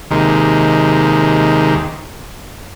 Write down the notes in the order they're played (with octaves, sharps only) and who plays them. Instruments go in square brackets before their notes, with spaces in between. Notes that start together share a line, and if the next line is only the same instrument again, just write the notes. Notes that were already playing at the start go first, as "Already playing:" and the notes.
[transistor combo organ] D#2 C3 D#3 G#3